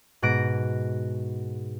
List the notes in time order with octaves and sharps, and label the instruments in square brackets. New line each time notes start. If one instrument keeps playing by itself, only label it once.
[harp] G#2 B2 F#6 A#6 D7